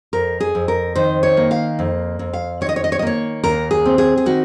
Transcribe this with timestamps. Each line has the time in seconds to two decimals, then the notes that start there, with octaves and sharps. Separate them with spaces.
0.13 F2 A#4
0.40 G#4
0.55 F2
0.68 A#4
0.95 D#3 C5
1.23 C#5
1.37 A#3
1.51 F5
1.79 F2
2.19 F2
2.33 F5
2.61 D#3 C#5
2.69 D#5
2.76 C#5
2.84 D#5
2.92 C#5
2.99 D#5
3.02 A#3 C#5
3.44 D#2 A#4
3.71 G#4
3.86 C4
3.98 G#4
4.17 G#4
4.26 D#3 F#4